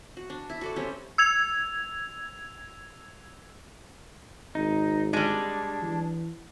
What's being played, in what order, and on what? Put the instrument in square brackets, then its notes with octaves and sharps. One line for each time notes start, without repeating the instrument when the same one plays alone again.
[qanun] F#4
D4
E4
F#4 A4 D5
G3 C4 C#4 E4
[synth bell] E6 G#6 F7
[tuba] G#1 [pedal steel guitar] D#4
[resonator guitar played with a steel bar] G3 G#3 [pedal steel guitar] D4
[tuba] E3